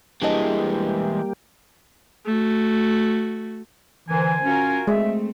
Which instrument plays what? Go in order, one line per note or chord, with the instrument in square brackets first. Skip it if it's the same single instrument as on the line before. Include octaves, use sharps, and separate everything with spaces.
[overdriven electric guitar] E3 G#3 [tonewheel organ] G3 A#3 G4 [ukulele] D4 G#4 D#5
[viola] A3 F#4
[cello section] D3 A#4 C5 [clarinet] E3 [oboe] G#5
[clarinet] C#4 [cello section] F4 F#4 A#4
[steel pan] G#3 [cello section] A3 C4 [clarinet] E5